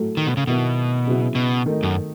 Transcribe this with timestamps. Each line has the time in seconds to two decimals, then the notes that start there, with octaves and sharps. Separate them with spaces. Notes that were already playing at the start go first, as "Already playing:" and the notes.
Already playing: A2 F#3 A3
0.17 D#3
0.27 B2
0.37 C#3
0.47 B2 D#3 F#3 B3 E4
1.07 C#3 F#3 B3 E4
1.35 B2
1.66 D#3 A3 D#4
1.83 F#2